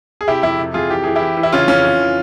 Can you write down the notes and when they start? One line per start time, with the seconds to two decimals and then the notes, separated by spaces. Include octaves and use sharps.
0.21 G#4
0.27 C3 E4 G4
0.43 F2 E4 G4
0.59 C3
0.74 F2 F4 G#4
0.90 E3 G4
1.04 E3 G#4
1.15 E4 G4
1.22 E3
1.37 E3
1.43 E4
1.52 C#3 C#4 F4
1.68 F2 C#4 F4
1.85 E3
2.00 E3